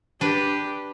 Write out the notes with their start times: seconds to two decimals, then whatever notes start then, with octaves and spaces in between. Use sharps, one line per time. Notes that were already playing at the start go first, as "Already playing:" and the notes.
0.21 D4 G4 B4